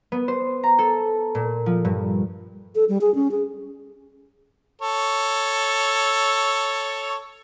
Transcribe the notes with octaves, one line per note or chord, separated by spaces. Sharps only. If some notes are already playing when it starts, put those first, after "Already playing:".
B3
C5
A#5
A4
A#2
F3
G2
A4
G3
G#4
C#4
G#4
A4 C#5